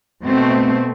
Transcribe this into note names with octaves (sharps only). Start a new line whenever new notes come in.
B2 A3 C4